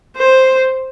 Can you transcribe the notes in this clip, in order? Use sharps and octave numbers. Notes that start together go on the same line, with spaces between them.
C5